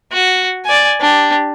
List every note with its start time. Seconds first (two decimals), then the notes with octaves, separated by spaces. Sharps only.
0.12 F#4
0.65 D5 G#5
1.00 D4 G4